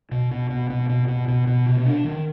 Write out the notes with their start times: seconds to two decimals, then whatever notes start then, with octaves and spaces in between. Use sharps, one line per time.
0.11 B2
0.31 B2
0.50 B2
0.70 B2
0.89 B2
1.08 B2
1.28 B2
1.47 B2
1.66 C3
1.85 D4
2.05 D#3